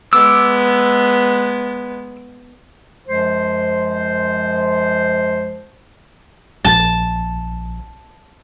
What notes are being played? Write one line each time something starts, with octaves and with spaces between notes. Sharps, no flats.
G#3 B3 D6 E6
F#2 F3 G#3 C5
A#1 A5